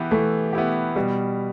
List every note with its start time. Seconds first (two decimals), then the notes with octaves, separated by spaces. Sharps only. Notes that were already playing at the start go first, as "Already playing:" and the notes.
Already playing: E3 B3 E4 G4
0.11 E3 A3
0.53 B3 E4 G4
0.96 B2 G3